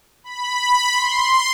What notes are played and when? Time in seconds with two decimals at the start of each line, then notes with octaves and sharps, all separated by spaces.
0.24 B5
0.93 C6